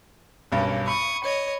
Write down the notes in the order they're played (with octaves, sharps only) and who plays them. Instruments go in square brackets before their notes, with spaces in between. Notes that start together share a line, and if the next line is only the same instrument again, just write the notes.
[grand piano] B1 G2 [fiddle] A#3 C#4
[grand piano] B5 [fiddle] C#6 D#6
[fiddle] C#5 D#5